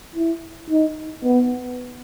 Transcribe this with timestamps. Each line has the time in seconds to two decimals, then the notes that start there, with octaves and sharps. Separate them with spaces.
0.16 E4
0.70 D#4
1.24 B3